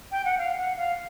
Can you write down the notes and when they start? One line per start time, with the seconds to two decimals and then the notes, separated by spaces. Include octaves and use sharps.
0.12 G5
0.25 F#5
0.38 F5
0.58 F#5
0.77 F5